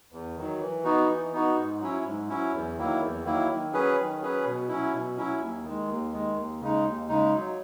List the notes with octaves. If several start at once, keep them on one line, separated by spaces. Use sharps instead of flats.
E2
D#3 F#3
E3
B3 D#4 F#4
E3
B3 D#4 F#4
G#2
F#3 C#4 E4
G#2
F#3 C#4 E4
E2
D#3 F#3 A#3 E4
E2
D#3 F#3 A#3 E4
D#3
F#3 C#4 G#4 B4
D#3
F#3 C#4 G#4 B4
B2
F#3 C#4 E4
B2
F#3 C#4 E4
D#2
D#3
G#3
D#2
D#3 G#3
D#2
C#3 G#3 D#4
D#2
C#3 G#3 D#4
F#3